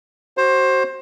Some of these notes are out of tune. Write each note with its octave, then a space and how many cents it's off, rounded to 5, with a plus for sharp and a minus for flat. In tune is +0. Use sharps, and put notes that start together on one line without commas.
F#4 +30 C5 +20